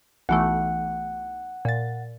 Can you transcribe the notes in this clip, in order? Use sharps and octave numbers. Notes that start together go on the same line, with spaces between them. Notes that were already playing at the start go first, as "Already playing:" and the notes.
B1 E3 A3 F#5
A#2 A6